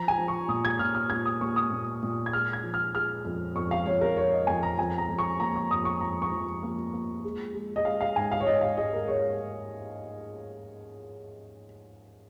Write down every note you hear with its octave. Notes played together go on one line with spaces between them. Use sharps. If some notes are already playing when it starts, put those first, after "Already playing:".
Already playing: F3 A#5
G#5
F3
C#6
A#2 D#6
G#6
A#2 F6
F6
A#2 G#6
D#6
A#3 C#6
D#6
A#2
A#2
G#6
G#3 F6
G#6
F3
F6
G#3 F6
F2
F2 C#6
F5
F2 C#5
A#4
F2 C#5
D#5
F2 G#5
A#5
F2 G#5
A#5
F2
C#6
A#3 A#5
C#6
F2 D#6
C#6
F2 A#5
C#6
F3
A#3
A#3
G#3
G#3
D#5
G#3 F5
F5
G#2 G#5
F5
C#5
G#2 D#5
F5
G#3 D#5
A#4
G#3 C#5